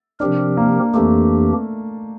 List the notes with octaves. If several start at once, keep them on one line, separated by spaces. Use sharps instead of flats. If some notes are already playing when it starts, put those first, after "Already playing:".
C3 F3 C4 D4 G4 A#4
A#3
F2 E3 A3 A#3 D4 G4